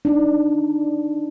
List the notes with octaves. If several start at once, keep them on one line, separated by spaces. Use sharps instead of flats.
D4 D#4